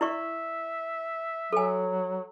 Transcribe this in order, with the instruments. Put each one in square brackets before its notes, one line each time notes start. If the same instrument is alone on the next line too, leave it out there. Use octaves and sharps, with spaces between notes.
[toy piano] E4 D5 C#6 [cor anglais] E5
[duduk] F#3 [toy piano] A4 G#5